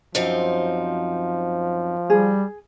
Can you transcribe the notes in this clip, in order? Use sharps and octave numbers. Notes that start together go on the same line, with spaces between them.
F#2 F3 C4 D#4
G3 G#4